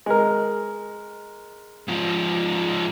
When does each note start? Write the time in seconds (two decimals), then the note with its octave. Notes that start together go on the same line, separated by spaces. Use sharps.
0.06 G#3 A#4
1.88 G#2 F3